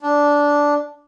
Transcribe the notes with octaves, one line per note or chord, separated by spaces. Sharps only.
D4